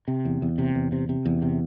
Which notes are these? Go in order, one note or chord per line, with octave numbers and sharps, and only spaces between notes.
C3
E2
E2
C3
E2
C3
C3
E2
C3